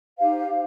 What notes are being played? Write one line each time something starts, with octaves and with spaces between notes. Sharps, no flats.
D#4 G4 C5 F5